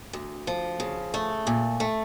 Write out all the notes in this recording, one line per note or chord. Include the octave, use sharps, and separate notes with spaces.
D2
F3
C#3
A3
A#2
A3